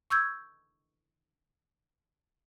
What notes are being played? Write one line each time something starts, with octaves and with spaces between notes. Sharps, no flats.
C#6 E6 G6 G#6